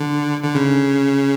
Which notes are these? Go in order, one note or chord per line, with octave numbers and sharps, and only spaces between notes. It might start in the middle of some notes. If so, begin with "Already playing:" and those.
Already playing: D3
D3
C#3